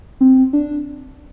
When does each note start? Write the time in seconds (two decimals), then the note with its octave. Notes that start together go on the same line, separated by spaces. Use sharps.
0.21 C4
0.53 D4